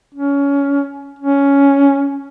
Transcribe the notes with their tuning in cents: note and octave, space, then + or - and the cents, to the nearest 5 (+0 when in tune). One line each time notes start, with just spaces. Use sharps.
C#4 +20
C#4 +10